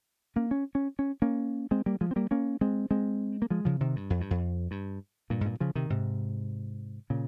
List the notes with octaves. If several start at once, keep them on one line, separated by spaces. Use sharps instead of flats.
A#3 C#4
C#4
C#4
C#4
A#3 C#4
G#3 C4
G3 A#3
F3 G#3
C4
G3 A#3
A#3 C#4
G#3 C4
G#3 C4
A#3
F3 G#3
C#3 F3
C3 D#3
G2
F2
G2
F2
G2
G2 A#2
G#2
G2 A#2
C#3 F3
C3 D#3
G#2 C3
A#2 C#3